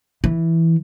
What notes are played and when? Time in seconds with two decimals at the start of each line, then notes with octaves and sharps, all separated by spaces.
0.24 E3